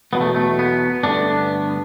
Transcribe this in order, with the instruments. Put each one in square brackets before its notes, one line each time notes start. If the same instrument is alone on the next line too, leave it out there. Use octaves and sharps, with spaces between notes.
[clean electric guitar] E2 B2 F#3 B3
A3
A3
B3
G2 D3 A3 B3 D4